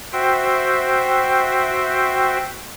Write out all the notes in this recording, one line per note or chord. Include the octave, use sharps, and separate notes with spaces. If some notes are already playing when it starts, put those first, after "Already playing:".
F#4 C5 E5 G5